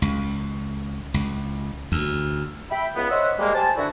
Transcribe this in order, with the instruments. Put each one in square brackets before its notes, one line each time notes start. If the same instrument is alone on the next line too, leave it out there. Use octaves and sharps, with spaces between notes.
[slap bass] C#2
C#2
D2
[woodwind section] E5 G5 B5
C#2 B3
C5 C#5 D#5 E5 F#5
G3 G#3 A#3
G4 C5 G#5 A5
D3 E4 F#4